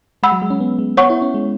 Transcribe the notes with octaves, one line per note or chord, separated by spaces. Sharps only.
G#3 F#5 B5 E6
F#3
G#3
C#4
B3
G#3
B3 C#5 F#5 C#6
E4
C#4
G#3